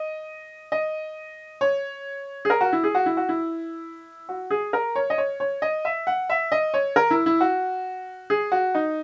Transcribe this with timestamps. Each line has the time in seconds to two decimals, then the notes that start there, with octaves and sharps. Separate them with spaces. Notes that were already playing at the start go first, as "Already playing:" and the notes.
Already playing: D#5
0.72 D#5
1.61 C#5
2.45 G#4
2.50 A#4
2.61 F#4
2.73 E4
2.84 G#4
2.95 F#4
3.06 E4
3.17 F#4
3.29 E4
4.29 F#4
4.51 G#4
4.73 A#4
4.96 C#5
5.10 D#5
5.18 C#5
5.40 C#5
5.62 D#5
5.85 E5
6.07 F#5
6.30 E5
6.52 D#5
6.74 C#5
6.96 A#4
7.11 E4
7.26 E4
7.41 F#4
8.30 G#4
8.52 F#4
8.75 D#4